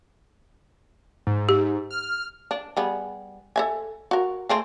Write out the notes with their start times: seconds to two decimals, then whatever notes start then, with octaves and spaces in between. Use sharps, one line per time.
1.27 G#2
1.49 G4
1.91 F6
2.51 D4
2.77 G3 B3 G#4
3.56 A4 E5 G#5
4.11 F#4 A#4
4.49 A3 C4 G#4